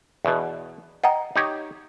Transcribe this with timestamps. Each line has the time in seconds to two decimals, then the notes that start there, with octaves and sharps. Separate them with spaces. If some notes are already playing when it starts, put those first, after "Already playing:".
0.25 E2 B2
1.04 D#5 F#5 G5 A#5
1.36 D#4 G4 C#5